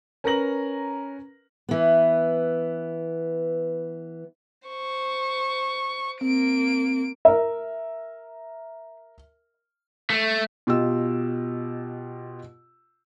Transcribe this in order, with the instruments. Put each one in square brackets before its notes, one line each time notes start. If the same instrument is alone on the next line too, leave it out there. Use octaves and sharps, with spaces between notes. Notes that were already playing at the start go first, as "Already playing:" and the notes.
[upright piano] C#4 A#4 B4 A#5 A#6 F#7
[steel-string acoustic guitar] E3 B3
[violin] C5 C#6
[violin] A#3 D7 [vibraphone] C4
[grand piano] A#4 E5
[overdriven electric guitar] A3
[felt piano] B2 F4 G4 D#5 E6